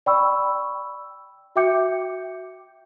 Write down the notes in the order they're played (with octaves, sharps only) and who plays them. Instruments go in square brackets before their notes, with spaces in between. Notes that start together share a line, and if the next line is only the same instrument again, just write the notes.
[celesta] D5 G5 B5 C#6 E6
F#4 E5 G5 D6 G6 C#7